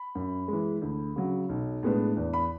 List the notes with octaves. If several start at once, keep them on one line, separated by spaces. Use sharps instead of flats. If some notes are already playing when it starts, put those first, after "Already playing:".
Already playing: B5
F#2
E3 G#3
D2
C#3 F#3
B1
A2 G#3 B3 D4
E2
B5